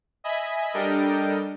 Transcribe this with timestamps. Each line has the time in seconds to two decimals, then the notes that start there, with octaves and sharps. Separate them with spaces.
0.24 D#5 E5 G#5 B5 B6
0.74 G3 D4 A4 A#4 D#5 G5